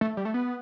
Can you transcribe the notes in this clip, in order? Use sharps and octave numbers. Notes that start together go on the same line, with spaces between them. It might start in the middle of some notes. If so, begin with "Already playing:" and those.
A3
G3
A3
B3